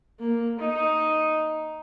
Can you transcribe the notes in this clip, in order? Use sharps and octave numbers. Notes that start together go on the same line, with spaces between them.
A#3
D#4